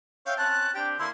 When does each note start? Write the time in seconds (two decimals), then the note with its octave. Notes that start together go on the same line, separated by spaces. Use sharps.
0.26 C#5 E5 F5 G5
0.38 C4 C#4 A5 F#6
0.74 C4 D4 G4 G5
0.98 D3 A#3 E4 C6